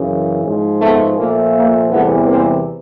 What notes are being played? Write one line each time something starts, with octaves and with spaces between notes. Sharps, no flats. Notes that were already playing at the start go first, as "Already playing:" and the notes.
Already playing: F#2 C#3 E3
G#2 F3 G#3
A3 B3
A#2 F3 A3 A#3
A#3
E2 C3 E3 G3 A3 B3
A#3 C4